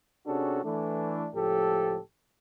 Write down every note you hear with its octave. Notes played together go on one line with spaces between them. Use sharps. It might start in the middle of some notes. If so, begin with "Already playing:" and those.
C3 C#4 D4 F#4 G#4 A4
E3 A3 D4
C#2 A2 F3 G4 A4